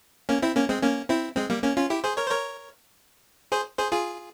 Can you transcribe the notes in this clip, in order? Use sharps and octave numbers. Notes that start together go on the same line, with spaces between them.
A#3 C#4
C4 E4
A#3 C#4
G#3 C4
A#3 C#4
C4 E4
G#3 C4
G3 A#3
A#3 C#4
C#4 F4
E4 G4
G#4 C5
A#4 C#5
C5
A#4 C#5
G#4 C5
G#4 C5
F4 G#4